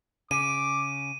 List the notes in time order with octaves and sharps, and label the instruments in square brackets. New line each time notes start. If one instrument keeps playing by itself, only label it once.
[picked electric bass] C#3 [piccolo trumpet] D6 [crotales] D#7